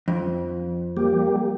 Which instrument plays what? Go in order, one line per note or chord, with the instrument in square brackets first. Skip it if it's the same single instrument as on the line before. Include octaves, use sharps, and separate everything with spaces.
[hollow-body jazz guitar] F2
[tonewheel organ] G3 A#3 G4